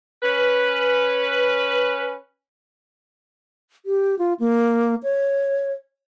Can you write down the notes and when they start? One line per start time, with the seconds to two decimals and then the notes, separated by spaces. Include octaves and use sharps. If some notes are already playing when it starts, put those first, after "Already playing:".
0.23 C#4 B4
3.86 G4
4.19 F4
4.40 A#3
5.03 C#5